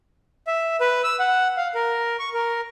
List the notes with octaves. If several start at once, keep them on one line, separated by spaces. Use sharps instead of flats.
E5
B4
E6
F#5
F5
A#4
C#6
A#4